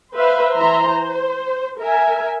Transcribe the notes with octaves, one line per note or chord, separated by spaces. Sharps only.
B4 C5 E5 F5
E3 E5 A#5 C6
C5
A#4 E5 G#5